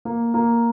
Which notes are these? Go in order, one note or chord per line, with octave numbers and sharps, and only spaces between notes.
A#3
A#3